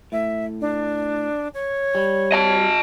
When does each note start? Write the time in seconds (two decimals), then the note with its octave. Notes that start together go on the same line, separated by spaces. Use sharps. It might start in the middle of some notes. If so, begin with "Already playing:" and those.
0.12 A2 E5
0.61 D4
1.54 C#5
1.95 G3
2.32 D#5 A5